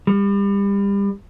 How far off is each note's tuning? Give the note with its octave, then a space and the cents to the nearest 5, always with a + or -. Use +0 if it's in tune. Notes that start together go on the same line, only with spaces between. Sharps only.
G3 +30